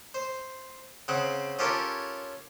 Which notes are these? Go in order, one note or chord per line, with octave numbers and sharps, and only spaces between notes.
C5
C#3 C4 F#5
C#4 F4 G4 A4 A#4 C#5